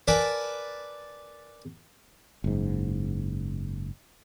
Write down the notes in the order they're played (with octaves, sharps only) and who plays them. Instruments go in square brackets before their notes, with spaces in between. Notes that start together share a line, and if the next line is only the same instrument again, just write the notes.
[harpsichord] A#4 B4 D5 G#5 A5
[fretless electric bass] F#1 G#2